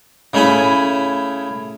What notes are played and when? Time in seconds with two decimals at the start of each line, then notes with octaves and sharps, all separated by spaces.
0.33 C#3 A3 C#4 E4 G#5 B5